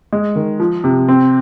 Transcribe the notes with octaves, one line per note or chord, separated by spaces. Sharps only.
G#3
D#3
F3
C3
C4